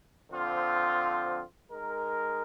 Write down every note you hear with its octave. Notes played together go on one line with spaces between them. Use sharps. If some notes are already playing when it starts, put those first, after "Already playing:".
D3 F3 C4 F4 C5
G#3 D#4 A#4